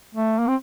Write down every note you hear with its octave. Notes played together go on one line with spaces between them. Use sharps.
A3
A#3
C4